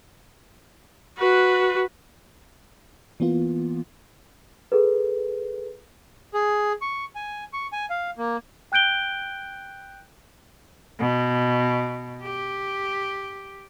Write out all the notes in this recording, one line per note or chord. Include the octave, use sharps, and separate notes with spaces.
F#4 B4
E3 A#3 B3 F4
G#4 A4 B4
G#4
C#6
G#5
C#6
G#5
F5
A#3
G5 F#6 G6 D7 G7
B2
G4